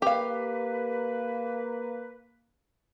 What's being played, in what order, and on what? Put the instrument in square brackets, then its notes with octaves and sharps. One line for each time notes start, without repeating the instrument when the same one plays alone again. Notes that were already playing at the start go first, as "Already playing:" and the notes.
[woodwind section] A#3 B4 [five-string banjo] G4 F5